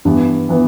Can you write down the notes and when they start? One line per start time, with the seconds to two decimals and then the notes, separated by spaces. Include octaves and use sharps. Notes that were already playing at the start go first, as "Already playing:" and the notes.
0.05 G2 E3 B3
0.49 E3 B3